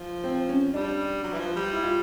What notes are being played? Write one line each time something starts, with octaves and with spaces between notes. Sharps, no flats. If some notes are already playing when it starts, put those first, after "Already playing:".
Already playing: F3
C4
C#4
G3 D4
F#3
E3
F3
G3
E4
F4